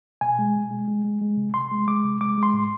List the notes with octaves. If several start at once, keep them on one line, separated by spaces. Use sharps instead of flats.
B2 G#5
G#3
B2
G#3
G#3
G#3
G#3
C3
C3 C6
G#3
G#3 D6
C3
G#3 D6
G#3
C6
A2